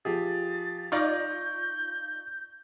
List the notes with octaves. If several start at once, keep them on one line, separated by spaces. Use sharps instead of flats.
F3 G4 G#4 A6
D#4 F4 D5 C#6 G6 A#6